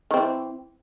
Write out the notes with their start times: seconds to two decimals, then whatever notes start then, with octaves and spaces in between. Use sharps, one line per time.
0.11 D#3
0.14 C4
0.17 E3